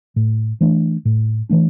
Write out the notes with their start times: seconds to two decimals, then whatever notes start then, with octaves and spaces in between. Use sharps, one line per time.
0.16 A2
0.61 E3 A3 D4
1.05 A2
1.49 E3 A3 D4